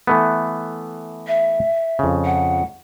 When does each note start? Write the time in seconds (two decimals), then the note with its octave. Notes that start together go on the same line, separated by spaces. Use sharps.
0.07 E3 A3 B3
1.27 E5
1.99 F2 C#3
2.25 F#5